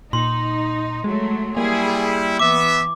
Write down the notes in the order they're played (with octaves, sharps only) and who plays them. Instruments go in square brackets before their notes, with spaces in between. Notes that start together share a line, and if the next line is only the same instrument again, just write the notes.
[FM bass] A#2 [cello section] D#4 [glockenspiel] C6
[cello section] F#3 A3 [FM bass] G#3
[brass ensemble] G3 E4 [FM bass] A#3 [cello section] G#4
[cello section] E3 [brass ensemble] B3 E5 [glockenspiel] D6